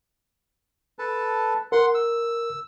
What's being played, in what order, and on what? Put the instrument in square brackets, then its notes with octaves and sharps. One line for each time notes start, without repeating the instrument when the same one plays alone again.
[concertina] A4 B4 A5
[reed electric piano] A#4 [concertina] F#5 C6
[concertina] E6